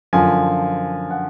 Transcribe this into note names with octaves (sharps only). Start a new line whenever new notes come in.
F#2 D3 F3 G#5
F#5